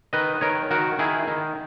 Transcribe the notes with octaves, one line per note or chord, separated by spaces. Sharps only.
D#3 B4 D#5
D#3 A#4 C#5
D#3 F#4 A#4
D#3 E4 G#4
D#3